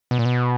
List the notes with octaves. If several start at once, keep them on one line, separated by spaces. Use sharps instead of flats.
B2
A#2
B2